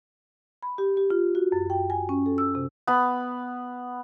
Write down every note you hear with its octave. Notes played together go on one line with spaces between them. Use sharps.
B5
G4
G4
F4
F#4
F#2
G5
G#5
C#4
A4
E6
C3
B3 B5